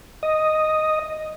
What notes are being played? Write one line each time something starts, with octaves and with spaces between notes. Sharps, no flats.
D#5